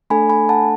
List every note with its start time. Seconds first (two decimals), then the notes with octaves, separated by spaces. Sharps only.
0.10 A3 D4 A4 G#5 B5
0.29 G#5 B5
0.49 F#5 A5